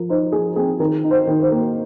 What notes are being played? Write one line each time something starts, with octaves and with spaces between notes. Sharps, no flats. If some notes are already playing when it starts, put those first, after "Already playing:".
Already playing: F3 A#4
D#4 C5
F3 G#4
C4 G#4
D#3 A#4
D#4
C5
D#3
C5
A#3